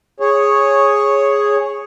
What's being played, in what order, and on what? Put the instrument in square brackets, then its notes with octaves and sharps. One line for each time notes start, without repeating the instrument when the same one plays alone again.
[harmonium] G#4 C#5